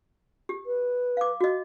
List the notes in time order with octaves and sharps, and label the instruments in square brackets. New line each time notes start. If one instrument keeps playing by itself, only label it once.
[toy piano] G4
[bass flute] B4
[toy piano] F5 D6
F#4 D#5